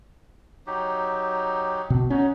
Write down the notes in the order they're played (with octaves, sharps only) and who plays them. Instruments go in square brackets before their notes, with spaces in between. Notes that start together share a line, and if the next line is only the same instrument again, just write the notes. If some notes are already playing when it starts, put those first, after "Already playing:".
[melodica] F#3 D#4 G4
[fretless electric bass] B2
[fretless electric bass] C#4 [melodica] D#4 F#4